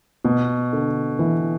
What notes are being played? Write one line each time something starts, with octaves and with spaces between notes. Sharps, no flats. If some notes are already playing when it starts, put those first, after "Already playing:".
B2
D3
E3